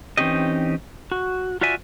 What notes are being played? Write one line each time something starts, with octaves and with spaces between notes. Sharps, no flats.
E3 C4 C#4 D#4 G4 D#5
F#4
F4 F#4 D5 E5 G#5